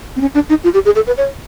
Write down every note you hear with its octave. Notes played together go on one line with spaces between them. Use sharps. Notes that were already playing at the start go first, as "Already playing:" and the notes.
C4
C#4
D4
D#4
F4
G4
G#4
A4
B4
C#5